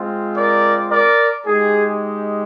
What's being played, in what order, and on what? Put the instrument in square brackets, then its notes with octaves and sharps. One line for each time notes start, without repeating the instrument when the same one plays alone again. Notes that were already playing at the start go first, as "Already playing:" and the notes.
Already playing: [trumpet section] G#3 C4 F4
A#4 D5
A#4 D5
G#3 D#4 G4 G#4